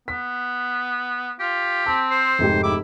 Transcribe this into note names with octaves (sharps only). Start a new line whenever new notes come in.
B3 B6
F4 G4
C4 A5
C5
F1 G#2 G4
E4 D6